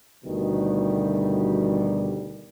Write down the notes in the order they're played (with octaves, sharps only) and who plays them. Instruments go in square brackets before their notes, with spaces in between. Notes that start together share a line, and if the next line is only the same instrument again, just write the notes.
[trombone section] D2 B2 D#3 G3